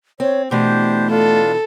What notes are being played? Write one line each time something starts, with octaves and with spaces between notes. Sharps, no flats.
C4 C#5
B2 E3 A3 D4 G4 C5
D4 F4 A4